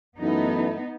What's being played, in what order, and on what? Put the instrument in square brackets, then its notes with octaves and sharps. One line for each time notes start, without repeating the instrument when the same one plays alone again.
[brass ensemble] F#2 E3 A3 E4 [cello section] B3 D#4